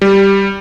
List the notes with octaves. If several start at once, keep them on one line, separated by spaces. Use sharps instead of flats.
G3